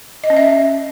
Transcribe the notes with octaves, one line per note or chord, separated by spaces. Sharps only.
D#5
C#4
E5